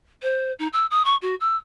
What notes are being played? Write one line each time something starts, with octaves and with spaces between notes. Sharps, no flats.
C5
D#4
E6
D#6
C#6
F#4
E6